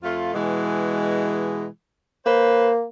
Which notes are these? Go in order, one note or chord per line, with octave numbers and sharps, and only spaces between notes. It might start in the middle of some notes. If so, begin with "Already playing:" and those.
F2 A3 F4
B2 E3 G#3
A#3 B4 C5